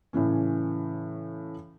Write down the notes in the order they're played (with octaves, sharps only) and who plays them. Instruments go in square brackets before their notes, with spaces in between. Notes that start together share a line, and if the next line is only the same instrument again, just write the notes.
[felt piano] A2 C#3 E3 C#4